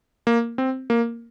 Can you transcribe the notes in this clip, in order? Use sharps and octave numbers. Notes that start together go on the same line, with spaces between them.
A#3
C4
A#3